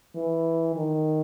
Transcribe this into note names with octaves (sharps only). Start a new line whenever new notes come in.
E3
D#3